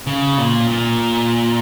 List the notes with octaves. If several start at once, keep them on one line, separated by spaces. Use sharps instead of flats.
C#3
A#2
A#2